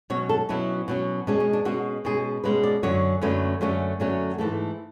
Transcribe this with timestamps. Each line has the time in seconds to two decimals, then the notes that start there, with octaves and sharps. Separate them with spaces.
0.10 B2 F#3 C#4 C#5
0.29 A4
0.49 B2 F#3 C#4 E4
0.88 B2 F#3 C#4
1.27 B2 G#3 C#4 D4
1.40 C#4
1.53 D4
1.65 B2 G#3 C#4 F#4
2.05 B2 G#3 C#4 G#4
2.44 B2 G#3 C#4 B4
2.63 D5
2.83 F#2 D3 F#3 C#4 C#5
3.21 F#2 D3 F#3 A3 C#4 B4
3.61 F#2 D3 F#3 A3 C#4
4.00 F#2 D3 F#3 A3 C#4
4.38 G#2 E3 A3 A4